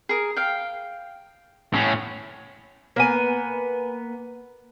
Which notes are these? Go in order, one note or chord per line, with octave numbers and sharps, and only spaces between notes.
G#4 A#4
F5 G5
A2 C#4
A#3 B3 G#5